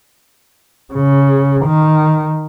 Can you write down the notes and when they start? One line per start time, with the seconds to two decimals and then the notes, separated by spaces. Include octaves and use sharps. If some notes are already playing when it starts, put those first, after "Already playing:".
0.94 C#3
1.65 D#3